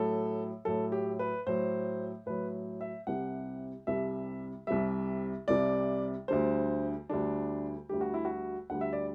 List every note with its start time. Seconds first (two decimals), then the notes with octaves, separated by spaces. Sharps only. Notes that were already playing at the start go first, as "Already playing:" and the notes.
Already playing: A2 F#3 A4
0.65 A2 F#3 A4
0.92 G4
1.19 B4
1.46 A2 F#3 C5
2.26 A2 F#3 B4
2.81 E5
3.07 C2 C3 G3 F#5
3.87 C2 C3 G3 E5
4.67 C2 C3 G3 E5
5.48 C2 C3 G3 D5
6.28 D2 D3 G3 C5
7.09 D2 D3 G3 D4
7.89 D2 D3 G3 G4
8.01 F#4
8.14 E4
8.25 F#4
8.70 D2 D3 G3 F#5
8.81 E5
8.93 D5